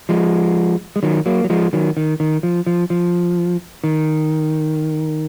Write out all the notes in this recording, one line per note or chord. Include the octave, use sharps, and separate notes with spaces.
F3 G#3
G#3
D#3 F#3
F#3 A#3
F#3
F3 G#3
D#3 F#3
D#3
D#3
F3
F3
F3
D#3